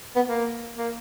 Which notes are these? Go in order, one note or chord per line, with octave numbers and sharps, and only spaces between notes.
B3
A#3
A#3